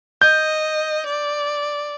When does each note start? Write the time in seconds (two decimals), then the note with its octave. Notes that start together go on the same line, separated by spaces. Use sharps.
0.22 D#5 G6
1.06 D5